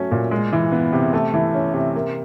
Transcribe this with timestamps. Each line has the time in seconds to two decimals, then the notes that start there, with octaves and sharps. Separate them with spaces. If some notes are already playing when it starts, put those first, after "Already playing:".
Already playing: F#3 A3 C#4
0.11 A#2
0.31 G#3
0.53 E3
0.72 B3
0.93 C3
1.13 A3
1.34 E3
1.54 C#4
1.74 C3
1.95 A#3